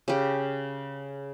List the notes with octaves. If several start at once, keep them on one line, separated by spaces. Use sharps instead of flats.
C#3 G4